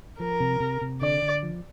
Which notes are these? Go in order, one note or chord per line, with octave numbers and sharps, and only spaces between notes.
F3 A#4
C3
C3
C3
D3 D5
D3
F3